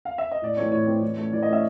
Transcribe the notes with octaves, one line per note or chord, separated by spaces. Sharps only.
F5
E5
D#5
A2 D5
E3 A3 C4 C#5
A2 C#5
E3 A3 C4
E3
A3 C#4
E3 D5
D#5
A3 C#4 E5